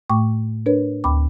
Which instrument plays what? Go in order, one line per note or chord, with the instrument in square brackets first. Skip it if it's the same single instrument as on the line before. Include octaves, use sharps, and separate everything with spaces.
[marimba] A2 A3 G5 C#6 D6
D4 A#4 B4 C#5
D2 G5 B5 D6